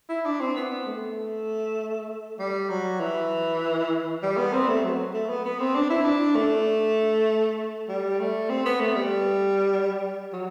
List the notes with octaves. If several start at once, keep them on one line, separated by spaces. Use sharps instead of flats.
E4
D4
C4
B3
A3
G3
F#3
E3
G3
B3
C4
A3
F#3
A3
B3
B3
C4
D4
E4
D4
A3
G3
A3
C4
B3
A3
G3
F#3